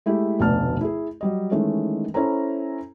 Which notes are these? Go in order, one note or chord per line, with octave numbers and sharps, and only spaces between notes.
G#3 A3 E4 G4
F1 D2 B2 D5 A5 F6
E4 G#4
F#3 G3 D#5
D#3 E3 G#3 A3 C#4
C#4 E4 A4 C5 A#5